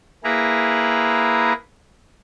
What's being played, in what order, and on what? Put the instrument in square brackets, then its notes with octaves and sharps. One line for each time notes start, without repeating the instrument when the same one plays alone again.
[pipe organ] A#3 E4 G#4 B4 A#5